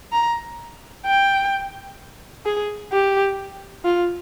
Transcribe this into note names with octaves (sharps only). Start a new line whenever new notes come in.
A#5
G5
G#4
G4
F4